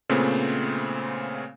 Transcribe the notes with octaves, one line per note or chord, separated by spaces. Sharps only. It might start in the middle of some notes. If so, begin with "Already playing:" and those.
A#2 C#3 A3 B3 C4